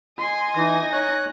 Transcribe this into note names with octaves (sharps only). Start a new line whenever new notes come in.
D#5 G#5 C6
E3 D#4 A#6
C#5 F#6